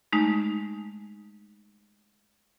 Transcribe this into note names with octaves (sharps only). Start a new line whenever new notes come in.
G#3 A3 D#4